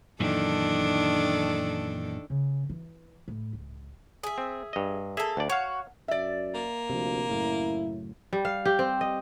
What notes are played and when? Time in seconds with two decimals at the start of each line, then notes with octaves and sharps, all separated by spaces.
0.20 F#2 A#2 D#3 E3 D4 A4
2.30 C#3
2.70 E3
3.28 A2
3.53 C#2
4.23 G#4 E5
4.38 C4
4.73 G2 D#5
5.17 A#3 G#4 A4 E5
5.37 D2 D5
5.50 F#4 C#5 F5
6.08 F#2 D5 E5
6.54 A#3
6.90 D2 C3 F3
7.29 F#2 A2 C#3 E4
8.33 G3
8.45 F5
8.65 G4
8.79 C4
9.01 D#5